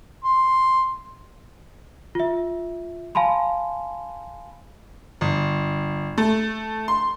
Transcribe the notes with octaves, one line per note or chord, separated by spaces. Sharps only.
C6
F4 E5
F5 G#5 A5 B5 C6
G1
A3
C6